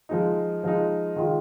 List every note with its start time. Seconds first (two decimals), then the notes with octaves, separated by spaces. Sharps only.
0.09 F3 G#3 D#4
0.64 F3 G#3 D#4
1.16 D#3 G#3 F4